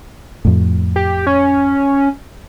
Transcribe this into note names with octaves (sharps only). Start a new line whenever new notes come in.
F2 A2
G4
C#4